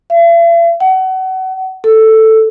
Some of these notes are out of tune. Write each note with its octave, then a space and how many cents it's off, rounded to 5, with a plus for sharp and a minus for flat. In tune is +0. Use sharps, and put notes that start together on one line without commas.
E5 +45
F#5 +30
A4 +5